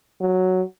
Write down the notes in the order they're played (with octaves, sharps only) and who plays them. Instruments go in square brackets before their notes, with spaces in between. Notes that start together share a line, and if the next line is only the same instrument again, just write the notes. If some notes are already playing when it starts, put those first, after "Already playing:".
[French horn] F#3